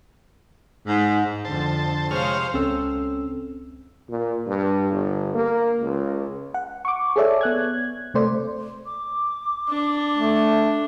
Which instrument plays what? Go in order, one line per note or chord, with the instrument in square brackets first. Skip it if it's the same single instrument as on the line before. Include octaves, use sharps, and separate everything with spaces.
[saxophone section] G#2
[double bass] F2 D3 [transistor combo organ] C5 A5
[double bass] C3 [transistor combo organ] G#3 C#5 F6 [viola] C5 F5
[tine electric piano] C#2 C4 C#4 A4 E6
[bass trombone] A#2
G2
G1
A#3
C#2
[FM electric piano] F#5
C#6 D6
G#4 A4 C#5 D5 E5
B3 F#6 G#6
C3 A3 C5 D5
[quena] D6
[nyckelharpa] D4
[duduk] A3